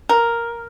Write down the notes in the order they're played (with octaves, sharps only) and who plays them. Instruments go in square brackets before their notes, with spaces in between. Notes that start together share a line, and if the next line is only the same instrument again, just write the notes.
[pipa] A#4